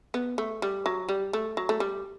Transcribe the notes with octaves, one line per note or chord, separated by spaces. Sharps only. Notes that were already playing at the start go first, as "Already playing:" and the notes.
B3
A3
G3
F#3
G3
A3
F#3
A3
G3